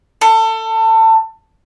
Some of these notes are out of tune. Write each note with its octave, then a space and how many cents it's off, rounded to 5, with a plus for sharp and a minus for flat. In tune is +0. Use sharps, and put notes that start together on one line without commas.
A4 +25